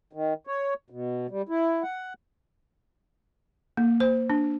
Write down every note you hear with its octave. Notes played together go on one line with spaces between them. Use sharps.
D#3
C#5
B2
G3
E4
F#5
A#3
C5
D4